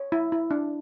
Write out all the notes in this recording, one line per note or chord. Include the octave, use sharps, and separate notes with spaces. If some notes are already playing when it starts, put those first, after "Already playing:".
Already playing: C#5
E4
E4
D4